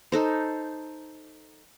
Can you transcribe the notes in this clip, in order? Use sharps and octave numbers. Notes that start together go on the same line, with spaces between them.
D#4 A4 C5